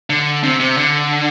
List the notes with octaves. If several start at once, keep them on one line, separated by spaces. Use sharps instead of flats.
D3
C3
C3
D3